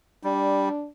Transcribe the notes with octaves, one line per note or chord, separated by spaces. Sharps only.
G3 D4